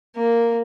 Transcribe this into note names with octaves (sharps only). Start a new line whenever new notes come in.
A#3